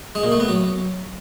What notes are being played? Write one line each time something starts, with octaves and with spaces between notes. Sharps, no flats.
G#3
A#2
A3
B3
F#3